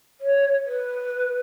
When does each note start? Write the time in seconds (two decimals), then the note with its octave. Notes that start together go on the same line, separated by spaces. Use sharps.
0.21 C#5
0.65 B4